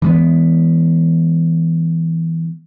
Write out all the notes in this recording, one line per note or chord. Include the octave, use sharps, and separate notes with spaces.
E3 G#3 B3